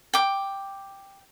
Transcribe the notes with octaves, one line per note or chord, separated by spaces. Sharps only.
G5 D6